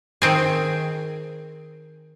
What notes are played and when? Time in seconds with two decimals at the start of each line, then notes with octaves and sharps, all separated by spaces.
0.22 D#3 C4 G#4